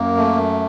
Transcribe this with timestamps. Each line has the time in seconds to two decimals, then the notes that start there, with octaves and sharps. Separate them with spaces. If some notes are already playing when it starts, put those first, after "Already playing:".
Already playing: F#2 A#3
0.17 A3